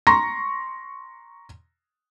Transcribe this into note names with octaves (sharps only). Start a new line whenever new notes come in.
A#5 C6 C#6 A#6